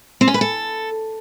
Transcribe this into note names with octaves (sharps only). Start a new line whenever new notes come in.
C4
C#4
B4
A4